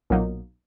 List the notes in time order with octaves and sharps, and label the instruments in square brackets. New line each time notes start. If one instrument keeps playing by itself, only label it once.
[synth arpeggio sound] B1 A#2 F#3 A#3 D#4